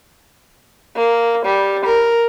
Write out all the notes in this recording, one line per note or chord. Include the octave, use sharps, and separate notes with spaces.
A#3
G3
A#4